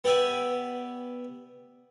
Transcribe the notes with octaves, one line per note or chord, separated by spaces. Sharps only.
B3 G4 D5 E5 G#5